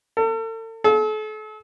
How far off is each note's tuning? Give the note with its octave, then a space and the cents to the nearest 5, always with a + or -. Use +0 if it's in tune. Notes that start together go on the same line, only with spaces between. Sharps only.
A4 +40
A4 -40